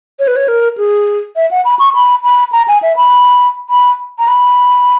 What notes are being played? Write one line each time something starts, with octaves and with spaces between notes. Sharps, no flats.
C#5
B4
C#5
A#4
G#4
E5
F#5
B5
C#6
B5
B5
A#5
G#5
E5
B5
B5
A#5
B5